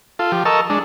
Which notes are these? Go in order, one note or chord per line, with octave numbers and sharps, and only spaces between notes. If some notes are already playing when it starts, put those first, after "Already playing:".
F4 A4
F3 G4
A4 A#4 D#5 A5 C#6 E6
G#3 D4